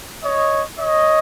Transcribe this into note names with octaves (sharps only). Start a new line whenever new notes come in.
C#5 D#5
C#5 D#5